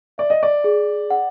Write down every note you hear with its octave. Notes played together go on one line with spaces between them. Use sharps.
D5 E5
D#5
D5
G#4
F#5